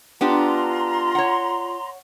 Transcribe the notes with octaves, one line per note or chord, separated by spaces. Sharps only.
B3 D4 F4 G4 A#5 C6
C#5 F#5